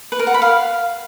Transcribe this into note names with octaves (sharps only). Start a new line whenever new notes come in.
B4
A#4
F#5
B5
F5